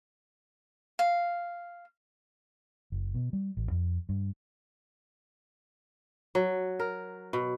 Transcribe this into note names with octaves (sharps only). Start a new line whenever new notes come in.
F5
F#1
B2
G3
A1
F2
G2
F#3
A#4
B2